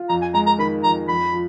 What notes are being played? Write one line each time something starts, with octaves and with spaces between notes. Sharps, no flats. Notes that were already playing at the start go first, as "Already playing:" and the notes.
Already playing: F4
F2 A#5
G#5
G#3 A#5
A#5
D#3 B5
F2 A#5
F2 B5
F3